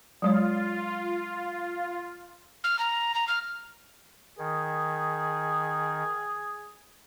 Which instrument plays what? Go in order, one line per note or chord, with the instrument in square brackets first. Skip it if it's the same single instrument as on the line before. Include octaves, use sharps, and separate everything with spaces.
[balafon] F#3 G#3 C#5 [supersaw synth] F4
[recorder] F6
A#5
A#5
F6
[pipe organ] D#3 [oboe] G#4